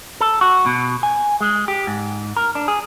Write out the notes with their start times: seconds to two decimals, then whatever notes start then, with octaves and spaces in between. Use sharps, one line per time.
0.20 A4
0.41 F#4
0.66 B2
1.03 G#5
1.41 G#3
1.68 G4
1.87 G#2
2.37 A#4
2.55 D4
2.68 G#4